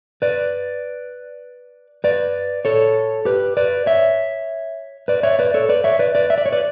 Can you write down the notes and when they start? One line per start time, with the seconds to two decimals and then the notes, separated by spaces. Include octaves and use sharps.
0.22 B4 D5
2.04 B4 D5
2.65 A4 C#5
3.25 G4 B4
3.57 B4 D5
3.86 C#5 E5
5.08 B4 D5
5.23 C#5 E5
5.39 B4 D5
5.54 A4 C#5
5.69 B4 D5
5.84 C#5 E5
5.99 B4 D5
6.15 B4 D5
6.30 E5
6.38 D5
6.46 C#5
6.52 B4 D5